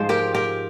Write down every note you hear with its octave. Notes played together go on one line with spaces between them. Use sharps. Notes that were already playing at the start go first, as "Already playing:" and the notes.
Already playing: G#2 F3 G#3 C5
G4 A#4
G4 A#4